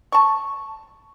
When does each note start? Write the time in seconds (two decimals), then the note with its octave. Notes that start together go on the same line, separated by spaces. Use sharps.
0.12 A5 C#6